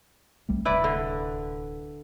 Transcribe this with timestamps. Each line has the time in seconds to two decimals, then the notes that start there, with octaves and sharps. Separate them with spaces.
0.49 C2 G3 A3
0.65 D1 C2 E4 B4 D5
0.84 D3